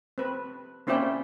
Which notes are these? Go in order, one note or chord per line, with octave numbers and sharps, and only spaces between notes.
C4 B4
A#3 C4 C#4 E4 D5 G5